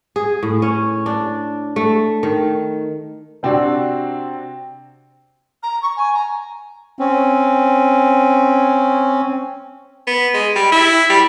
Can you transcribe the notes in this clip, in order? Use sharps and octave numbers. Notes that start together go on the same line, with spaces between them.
G#4
A2
C#4
D4
A3
D#3
C3 C4 D4 F#4
A#5
C#6
G#5
A#5
C4 C#4
B3
G#3
G3
E4
G3